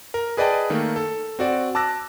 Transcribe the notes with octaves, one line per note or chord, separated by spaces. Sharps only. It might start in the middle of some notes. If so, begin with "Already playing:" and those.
A#4
G#4 B4 D5 D#5 G5 A5
D#3 A3 A#3
A4
C4 F#4 D5
A5 D6 E6 F#6 A#6